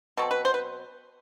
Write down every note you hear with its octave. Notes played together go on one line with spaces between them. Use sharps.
B2 F#3 C4 A4
B4
C5
B4